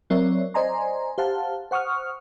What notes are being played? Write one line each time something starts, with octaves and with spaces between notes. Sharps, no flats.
F#3 C4 A#4 C#5 D5 E5
C5 D5 D#5 G#5 A#5 C6
G4 C5 F5 F#5 A5
C5 F#5 C#6 D#6 F6